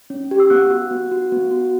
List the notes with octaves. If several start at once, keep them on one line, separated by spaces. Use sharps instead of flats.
C#4
G4
E6
B3 F#5 F#6
F#4
B3
F#4
B3
F#4